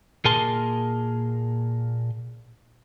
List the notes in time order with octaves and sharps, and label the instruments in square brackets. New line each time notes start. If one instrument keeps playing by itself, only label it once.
[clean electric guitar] A#2 A#3 G#4 A#4 A5 C6